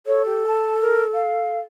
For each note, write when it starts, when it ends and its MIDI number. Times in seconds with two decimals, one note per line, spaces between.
0.06 1.59 69
0.06 0.22 73
0.25 0.44 67
0.47 0.74 81
0.81 1.03 70
1.14 1.59 77